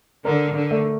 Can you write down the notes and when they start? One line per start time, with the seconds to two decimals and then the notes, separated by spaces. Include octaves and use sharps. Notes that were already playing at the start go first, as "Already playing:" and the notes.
0.25 D3 A#4
0.55 D3
0.71 A3